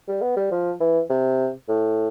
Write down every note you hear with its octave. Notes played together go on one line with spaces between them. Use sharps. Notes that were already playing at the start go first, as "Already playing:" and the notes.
G3
B3
G3
F3
E3
C3
A2